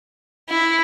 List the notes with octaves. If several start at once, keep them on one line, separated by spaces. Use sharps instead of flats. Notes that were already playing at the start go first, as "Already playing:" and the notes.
E4